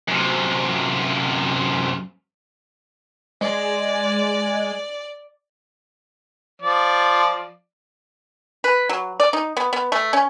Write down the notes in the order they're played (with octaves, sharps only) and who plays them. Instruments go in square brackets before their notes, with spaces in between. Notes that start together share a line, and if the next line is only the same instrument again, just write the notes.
[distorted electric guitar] F#2 C3
[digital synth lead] G#3 [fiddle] D5
[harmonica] F3 D5
[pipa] B4
F#3
D5
D#4
B3
B3
A3
C#4